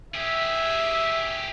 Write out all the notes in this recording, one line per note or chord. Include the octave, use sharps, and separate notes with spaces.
G4 G#4 E5